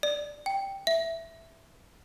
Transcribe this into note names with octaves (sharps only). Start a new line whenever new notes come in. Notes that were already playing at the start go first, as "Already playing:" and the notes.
D5
G5
E5